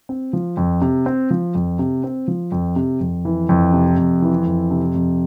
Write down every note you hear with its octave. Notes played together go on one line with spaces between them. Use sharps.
C4
F3
F2
C3
C4
F3
F2
C3
C4
F3
F2
C3
F2
E3
F2
C3
F2
E3
F2
C3
F2